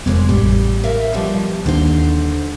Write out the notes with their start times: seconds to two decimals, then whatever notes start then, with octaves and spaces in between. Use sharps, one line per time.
0.06 F1 A#2 G#3 B3 C5
0.29 A1 G3
0.84 A#4 E5 F5
1.14 B2 F3 G3
1.66 D#2 D3 C5